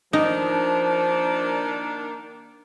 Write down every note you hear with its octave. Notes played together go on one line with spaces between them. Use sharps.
D#3 F3 A#3 D4 D#4